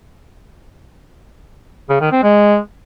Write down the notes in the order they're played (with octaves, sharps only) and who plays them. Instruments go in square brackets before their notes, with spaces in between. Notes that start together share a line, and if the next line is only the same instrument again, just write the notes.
[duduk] C#3
D#3
C4
G#3